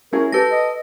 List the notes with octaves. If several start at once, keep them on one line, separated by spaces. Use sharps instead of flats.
C#4 E4 G#4 A#4
G4 A4 B4 A#6
D#5